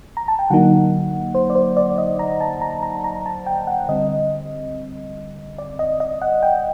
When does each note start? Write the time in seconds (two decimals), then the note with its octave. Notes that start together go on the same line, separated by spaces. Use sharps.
0.17 A#5
0.28 A5
0.39 G5
0.50 D3 F#3 A#3 D#4 F#5
1.35 C5
1.50 D5
1.55 C5
1.77 D5
1.98 D#5
2.19 A#5
2.41 A5
2.62 A#5
2.83 A#5
3.04 A#5
3.26 A5
3.46 G5
3.67 F#5
3.89 D3 G3 C4 D#5
5.58 D5
5.79 D#5
6.00 D#5
6.22 F#5
6.43 G5